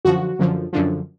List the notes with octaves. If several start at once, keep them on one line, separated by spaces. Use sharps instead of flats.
F#2 D3 F3 F#4
F#2 D3 F3
F#2 D3 F3